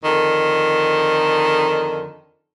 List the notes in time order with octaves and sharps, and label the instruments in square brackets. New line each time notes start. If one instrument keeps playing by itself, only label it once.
[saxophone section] F2 D3 D#3